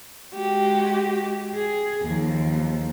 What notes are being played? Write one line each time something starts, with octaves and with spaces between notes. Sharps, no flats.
G#3 F#4 G4
G#4
D#2 F3